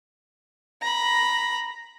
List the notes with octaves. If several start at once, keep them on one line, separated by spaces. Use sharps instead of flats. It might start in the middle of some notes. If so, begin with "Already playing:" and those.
A#5 B5